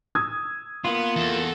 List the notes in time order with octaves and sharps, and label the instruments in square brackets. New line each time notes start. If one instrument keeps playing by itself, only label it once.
[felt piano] D#6 E6 G#6
[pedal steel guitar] A#3 F4 [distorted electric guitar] B3
[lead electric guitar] E2 [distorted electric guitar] A4